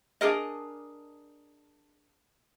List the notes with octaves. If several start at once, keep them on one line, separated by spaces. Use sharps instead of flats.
D4 G#4 A#4 D#5